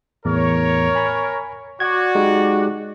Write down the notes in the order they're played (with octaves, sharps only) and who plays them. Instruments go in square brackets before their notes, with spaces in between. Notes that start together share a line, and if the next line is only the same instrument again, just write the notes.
[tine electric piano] E2 A2 [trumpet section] A#4 C#5
[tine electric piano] G#5 B5
[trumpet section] F#4 D5 [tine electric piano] G#6
[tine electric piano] G#3 D#4 G4